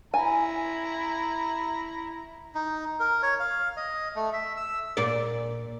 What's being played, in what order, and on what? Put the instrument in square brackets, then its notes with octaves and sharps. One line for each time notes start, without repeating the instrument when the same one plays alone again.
[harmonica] E4 A#5 [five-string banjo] G#5
[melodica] D#4
A#4
C#5
F5
D#5
A3
E5
E6
[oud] A#2 D5